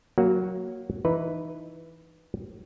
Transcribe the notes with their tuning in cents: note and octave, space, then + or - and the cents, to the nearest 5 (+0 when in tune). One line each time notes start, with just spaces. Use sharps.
F#3 +0 A#3 +0 F#4 +0
E3 +0 D#4 +0 B4 +0